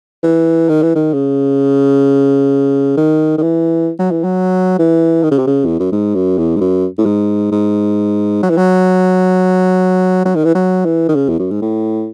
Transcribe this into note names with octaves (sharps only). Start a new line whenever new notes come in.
E3
D#3
E3
D#3
C#3
D#3
D#3
E3
F#3
E3
F#3
E3
D#3
C#3
C3
C#3
E2
F#2
G#2
F#2
E2
G#2
F#2
A2
G#2
G#2
F#3
E3
F#3
F#3
D#3
E3
F#3
E3
D#3
C#3
E2
F#2
G#2
A2